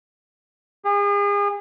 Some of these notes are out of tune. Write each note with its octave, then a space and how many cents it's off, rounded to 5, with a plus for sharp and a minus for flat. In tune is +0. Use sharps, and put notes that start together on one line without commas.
G#4 -40